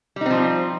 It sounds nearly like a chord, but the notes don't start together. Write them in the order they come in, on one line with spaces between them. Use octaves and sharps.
G3 D#4 C4 F3